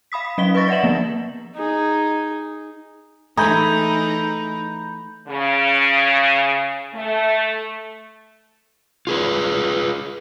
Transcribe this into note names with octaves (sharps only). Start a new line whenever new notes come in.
F5 B5 D#6 B6
B6
F#3 C#4 D#5 B6 G7
B4 D#5 C#6 A6 A#6
D5 E5 F#5 A#6 E7 F#7
F3 A#3 B3
D#4 G#4
E3 A3 D#4 G#4 A#5 B5 G6
C#3
A3
F4 G#4 B4